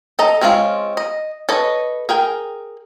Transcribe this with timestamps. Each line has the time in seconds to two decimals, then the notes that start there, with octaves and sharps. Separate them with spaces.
0.19 A4 D#5 A#5
0.41 G#3 C4 C#4 E4 F4
0.97 D#5
1.49 A4 B4 C#5 D#5
2.09 G#4 A#4 G5